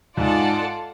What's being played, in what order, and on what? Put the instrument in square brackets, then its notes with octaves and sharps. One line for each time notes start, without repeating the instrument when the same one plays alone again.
[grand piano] G#2 [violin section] F4 A4 D5 F#5 A5